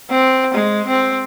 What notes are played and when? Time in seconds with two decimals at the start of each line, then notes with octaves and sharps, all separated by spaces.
0.10 C4
0.54 G#3
0.87 C4